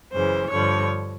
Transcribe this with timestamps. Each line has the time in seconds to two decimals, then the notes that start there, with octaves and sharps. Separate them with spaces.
0.12 F#2 C#3 E3 C5
0.51 G2 D3 F3 C#5